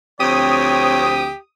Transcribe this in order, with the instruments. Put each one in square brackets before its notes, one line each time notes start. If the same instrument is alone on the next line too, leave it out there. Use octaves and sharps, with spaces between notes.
[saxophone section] D2 F3 C4 [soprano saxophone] G4 [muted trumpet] C#5 [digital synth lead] D#6